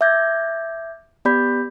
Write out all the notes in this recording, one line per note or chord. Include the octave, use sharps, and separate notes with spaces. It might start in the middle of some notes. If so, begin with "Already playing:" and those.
E5 D6 G6 G#6 A#6
B3 G4 D5 B5 G6 B6